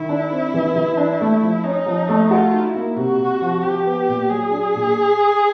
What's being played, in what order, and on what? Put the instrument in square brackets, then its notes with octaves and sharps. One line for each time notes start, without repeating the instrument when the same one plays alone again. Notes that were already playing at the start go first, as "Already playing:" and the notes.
Already playing: [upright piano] D#3 [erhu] E4
[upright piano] D4
C4
E3
E3
D4
A3
F3
[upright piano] C#4 [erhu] D#4
[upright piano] F3
A3
[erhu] F4 [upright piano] F#4
[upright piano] D#4
[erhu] E4
[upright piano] A#3
[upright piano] C3 [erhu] F#4
[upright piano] C3
F3
[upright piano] F3 [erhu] G4
[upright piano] B3
A#2
[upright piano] F#3 [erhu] G#4
[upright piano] D4
A#2